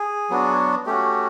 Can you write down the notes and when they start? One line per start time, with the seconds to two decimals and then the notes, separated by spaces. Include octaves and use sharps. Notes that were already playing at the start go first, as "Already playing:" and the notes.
Already playing: G#4
0.30 F#3 B3 D4 F#4
0.86 A3 C#4 F#4 G4